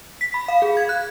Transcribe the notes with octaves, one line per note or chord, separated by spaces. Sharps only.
B6
B5
F5
G#4
G#6
F#6